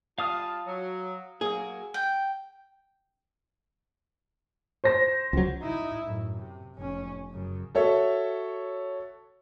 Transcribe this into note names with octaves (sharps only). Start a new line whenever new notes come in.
G3 F4 F5 A5 D#6 F6
F#3
F#3 A#3 G#4
G5
C5 A#6
C#2 F#3
D#4 E4
F#2 A2
C3
F1 C#4
F#2 C#3
F#4 A4 C#5 E5